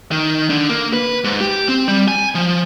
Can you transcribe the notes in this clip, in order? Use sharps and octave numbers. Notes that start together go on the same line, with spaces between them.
D#3
D3
A#3
B4
G#2
G4
C4
G3
G#5
F3